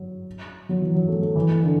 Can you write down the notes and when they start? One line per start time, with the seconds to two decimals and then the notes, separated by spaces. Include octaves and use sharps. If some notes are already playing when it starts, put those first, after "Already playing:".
Already playing: F#3
0.69 F#3
0.81 E3
0.94 F#3
1.08 A3
1.22 A3
1.36 E3
1.63 D3